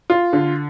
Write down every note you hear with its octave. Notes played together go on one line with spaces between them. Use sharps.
F4
D3